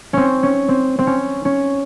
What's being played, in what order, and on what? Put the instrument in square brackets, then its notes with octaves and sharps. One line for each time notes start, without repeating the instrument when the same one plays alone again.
[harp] C4 C#4
C#4
C4
C4
C#4
C#4